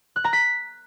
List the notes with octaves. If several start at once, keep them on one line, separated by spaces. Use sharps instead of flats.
F#6
A#5
B6